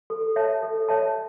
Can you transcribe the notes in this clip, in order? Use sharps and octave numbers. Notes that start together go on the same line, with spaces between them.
A4
C#5 E5 A5
A4
C#5 E5 A5